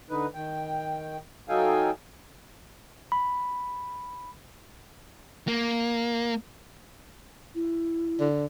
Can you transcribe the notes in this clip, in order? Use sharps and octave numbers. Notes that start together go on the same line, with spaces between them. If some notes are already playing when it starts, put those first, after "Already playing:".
D3 D#4 B4
D#3 G5
F#3 D#4 A4 F5 G5 G#5
B5
A#3
E4
D3